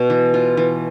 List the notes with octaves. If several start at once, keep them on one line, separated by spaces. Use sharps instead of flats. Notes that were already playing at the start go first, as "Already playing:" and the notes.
Already playing: B2
E3
F4
E3